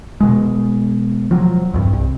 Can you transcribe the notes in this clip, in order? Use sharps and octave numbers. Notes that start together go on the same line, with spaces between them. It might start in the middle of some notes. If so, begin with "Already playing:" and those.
B2 G#3
F3 F#3
C2 G2
C2